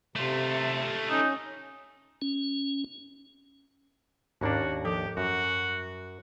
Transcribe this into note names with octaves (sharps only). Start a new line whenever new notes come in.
C3 A3 F4
C#4 D#4
C#4
D#2 G#2 A#3 C#4 D4 F#4
F3 G4 A4 D#6
F#2 F#4